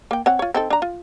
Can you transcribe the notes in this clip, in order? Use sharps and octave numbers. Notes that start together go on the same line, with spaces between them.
A#3 G5
C4 C#5 F#5
F4 C#5
C4 D#4 A4
D4 A#5
F4